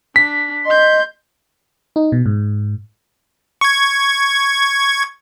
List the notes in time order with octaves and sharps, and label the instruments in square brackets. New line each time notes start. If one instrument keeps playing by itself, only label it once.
[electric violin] D4 [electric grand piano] B6
[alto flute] D#5 [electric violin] C6 G6
[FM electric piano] D#4
B2
G#2
[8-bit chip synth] C#6 G#6